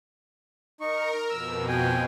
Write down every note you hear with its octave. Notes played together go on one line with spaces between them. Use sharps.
D#4 A#4 C#6
F2 B2 E6
G5 G#5